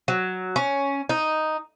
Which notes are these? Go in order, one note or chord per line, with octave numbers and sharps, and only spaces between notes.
F#3
C#4
D#4